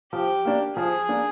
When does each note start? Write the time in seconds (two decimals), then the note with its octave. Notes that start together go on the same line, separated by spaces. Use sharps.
0.12 F3 G4
0.45 A#3 D4
0.76 F3 G#4
1.08 A#3 D4